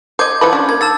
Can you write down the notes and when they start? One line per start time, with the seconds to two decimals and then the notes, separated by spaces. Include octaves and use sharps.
0.19 C5 D#5 D6 G6 G#6
0.41 E3 F3 B4
0.53 C#4 D4
0.69 A#3 G#6
0.81 D#3 A5 E6 A6